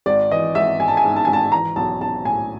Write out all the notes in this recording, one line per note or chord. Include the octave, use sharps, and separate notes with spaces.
G#1 D5
E3 D#5
G#1 E5
G#1 G#5
A5
G#5
G#2
A5
G#1 G#5
A5
E3 A#5
B1 A5
B1 A5
A2 G#5